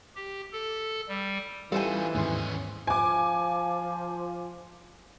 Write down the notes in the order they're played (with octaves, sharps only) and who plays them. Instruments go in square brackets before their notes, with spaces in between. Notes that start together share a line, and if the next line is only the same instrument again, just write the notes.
[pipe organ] G4
A4
G3
[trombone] E3 [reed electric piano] G3 [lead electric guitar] D#4 F4 [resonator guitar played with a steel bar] A4 C5 G#5
[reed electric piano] D#2 G#2 C6 [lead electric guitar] B3 C#4
[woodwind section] F3 [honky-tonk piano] G#5 D6